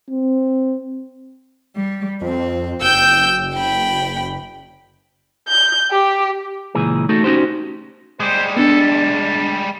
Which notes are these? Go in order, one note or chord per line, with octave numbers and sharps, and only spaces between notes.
C4
G3
F2 C4
F#1 G5 E6 G6
G5 B5
G6
G4
C#2 A#2 E3 G#4
A3 D#4 F#4 A4
C#4 D#4 F#4 G4 C5
G3 G#3 C5 D6 D#6
B3 D4 A4
A5